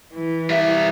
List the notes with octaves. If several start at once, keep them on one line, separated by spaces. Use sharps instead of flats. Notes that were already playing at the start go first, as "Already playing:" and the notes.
E3
G3 E5